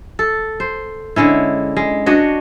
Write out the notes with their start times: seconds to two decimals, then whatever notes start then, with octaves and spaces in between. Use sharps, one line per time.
0.19 A4
0.60 C5
1.16 D3 G#3 C#4 E4
1.77 G#3
2.06 D4 F#4 C#5 D#5